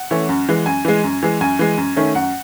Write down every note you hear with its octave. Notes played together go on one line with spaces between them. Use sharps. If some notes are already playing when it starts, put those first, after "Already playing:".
Already playing: F#5
E3 A3 C#4
F#2
E3 G#3
F#2 G#5
E3 G#3
F#2
E3 G#3
F#2 G#5
E3 G#3
F#2
D#3 A3 C#4
F#2 F#5